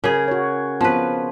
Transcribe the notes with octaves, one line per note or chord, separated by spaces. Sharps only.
C#3 G#4 A#4
F#4 C#5
F3 B3 C4 B4 C5